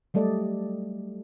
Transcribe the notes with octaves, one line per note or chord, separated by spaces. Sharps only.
F#3 G3 A3 A4 D5 D#5